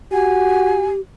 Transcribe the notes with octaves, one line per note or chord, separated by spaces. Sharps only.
F#4 G4 G#5